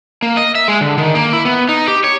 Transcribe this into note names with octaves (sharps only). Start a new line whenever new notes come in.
A#3
D#5
E5
G#3
D3
D#3
A#3
E4
B3
D#4
G4
C#5